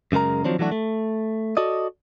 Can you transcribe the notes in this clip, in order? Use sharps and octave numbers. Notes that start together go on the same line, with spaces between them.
F#2 C#3 G#3 A#4 A#5
D#3 F3 F#3 C4 D4
E3 F#3 A3 D4 F#4
A3
F#4 A4 D5 D#5